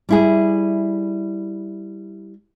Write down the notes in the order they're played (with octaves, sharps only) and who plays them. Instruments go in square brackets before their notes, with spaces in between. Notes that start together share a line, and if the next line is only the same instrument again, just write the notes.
[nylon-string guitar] G3 E4 G#4